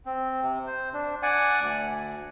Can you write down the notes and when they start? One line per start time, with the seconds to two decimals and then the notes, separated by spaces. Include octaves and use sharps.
0.06 C4
0.42 C3
0.67 C5
0.94 D4
1.23 D5 F#5 G#5
1.61 D2